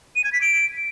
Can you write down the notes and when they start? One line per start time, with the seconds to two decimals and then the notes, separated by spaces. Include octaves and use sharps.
0.16 D#7
0.24 G#6
0.33 B6
0.41 D7